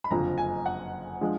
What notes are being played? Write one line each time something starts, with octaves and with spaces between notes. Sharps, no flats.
B5
F#1 F2 D3 F3 A#5
G#5
F#5
F3 G#3 D4